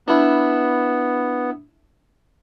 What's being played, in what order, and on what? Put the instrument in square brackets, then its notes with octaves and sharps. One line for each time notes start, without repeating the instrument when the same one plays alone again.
[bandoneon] B3 [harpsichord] D4 E4